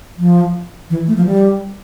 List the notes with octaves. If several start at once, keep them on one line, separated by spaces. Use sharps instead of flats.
F3
E3
A3
F3
G3